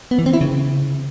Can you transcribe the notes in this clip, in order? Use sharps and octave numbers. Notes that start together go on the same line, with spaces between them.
B3
E3
C4
E4
C#3